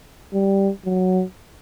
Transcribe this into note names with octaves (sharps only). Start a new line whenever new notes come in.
G3
F#3